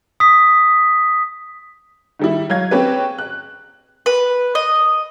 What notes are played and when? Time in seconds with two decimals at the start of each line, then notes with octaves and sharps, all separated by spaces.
0.20 D#6 B6
2.19 D#3 G3 E4
2.50 F#3 F5 G#6
2.71 C4 C#4 G4 B4
3.18 F#6
4.06 B4
4.55 D#5